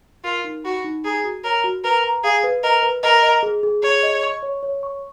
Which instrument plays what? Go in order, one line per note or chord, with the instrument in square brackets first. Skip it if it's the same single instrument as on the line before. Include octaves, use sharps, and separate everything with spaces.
[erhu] F4 [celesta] A#4
[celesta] D#4
[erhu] F#4 [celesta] B5
[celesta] D#4
[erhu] G#4 [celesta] A#5
[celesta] F#4
[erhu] A#4 [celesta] C#5
[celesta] F#4
[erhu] A#4 [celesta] B4
[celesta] A#5
[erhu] G#4 [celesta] F5
[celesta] B4
[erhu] A#4 [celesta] D#5
[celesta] B4
[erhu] A#4 [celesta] D#5
[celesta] D#5
G#4
G#4
[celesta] G#4 [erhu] C#5
[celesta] D#5
C#6
C#5
C#5
C#6